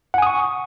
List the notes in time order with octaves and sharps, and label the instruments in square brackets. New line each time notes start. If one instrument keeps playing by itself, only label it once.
[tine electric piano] F#5
G#5
D#6
C#6